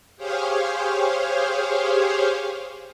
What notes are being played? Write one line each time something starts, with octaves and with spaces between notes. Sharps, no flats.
G4 G#4 C5 C#5 F5